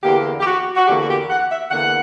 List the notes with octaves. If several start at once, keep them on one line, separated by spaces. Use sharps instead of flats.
E2 D3 A#3 G4
G4
F#4
F#4
E2 D3 A#3 G4
F#4
G4
F#5
E5
E2 D3 A#3 F#5